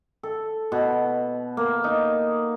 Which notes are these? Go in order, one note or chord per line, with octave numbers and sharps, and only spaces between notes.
A4
B2
A#3
D#4